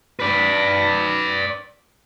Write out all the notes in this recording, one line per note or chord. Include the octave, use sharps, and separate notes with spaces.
B4 D5